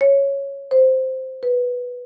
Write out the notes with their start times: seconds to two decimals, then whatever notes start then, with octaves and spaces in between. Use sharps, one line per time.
0.01 C#5
0.71 C5
1.43 B4